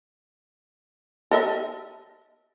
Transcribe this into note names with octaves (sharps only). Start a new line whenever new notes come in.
A4 D#5 E5